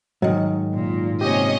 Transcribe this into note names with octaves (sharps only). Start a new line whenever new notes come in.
G#2 D#3 F#3
A#2
C3 A#3 C#4 G4 C#5 D#5